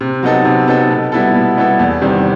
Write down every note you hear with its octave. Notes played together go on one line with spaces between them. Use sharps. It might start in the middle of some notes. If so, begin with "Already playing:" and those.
C3
F#3 B3 D#4 A4
C3
F#3 B3 D#4 A4
B2
G3 B3 E4 A4
B2
G3 B3 E4 A4
E2
C3 D#3 G3 B3